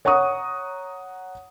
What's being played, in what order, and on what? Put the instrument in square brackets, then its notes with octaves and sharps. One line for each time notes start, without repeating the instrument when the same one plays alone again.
[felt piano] C#5 F#5 A#5 C#6 D#6